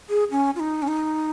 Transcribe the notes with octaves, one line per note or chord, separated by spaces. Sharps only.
G#4
C#4
F4
D#4
C#4
D#4